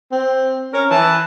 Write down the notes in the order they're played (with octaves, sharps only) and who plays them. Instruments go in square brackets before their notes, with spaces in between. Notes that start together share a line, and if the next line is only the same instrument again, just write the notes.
[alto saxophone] C4
[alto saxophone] C#4 [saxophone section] A#4
[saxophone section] E3 [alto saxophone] A5